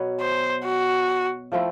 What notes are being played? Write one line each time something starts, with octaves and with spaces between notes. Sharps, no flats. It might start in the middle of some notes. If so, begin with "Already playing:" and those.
Already playing: B2 F#3 B3
C5
F#4
F3 A3 C4 E4